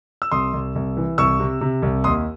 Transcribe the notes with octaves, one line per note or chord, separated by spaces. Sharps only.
E6
C2 C6 D#6
C2
C2
E3
C2 C#6 E6
C3
C3
C2
D#2 C6 D#6